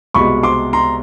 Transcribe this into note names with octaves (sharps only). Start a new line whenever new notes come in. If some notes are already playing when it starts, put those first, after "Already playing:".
C2 B2 G#3 B5 C#6
C6 D6
A#5 C6